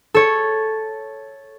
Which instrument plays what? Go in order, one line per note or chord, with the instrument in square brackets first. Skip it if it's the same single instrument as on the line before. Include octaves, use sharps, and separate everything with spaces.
[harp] A4 C#5